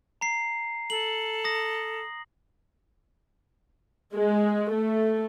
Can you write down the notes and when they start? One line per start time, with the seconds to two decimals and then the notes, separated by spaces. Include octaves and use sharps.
0.21 A#5 C7
0.90 A4 F#7
1.45 D#6 A#6
4.15 G#3
4.71 A3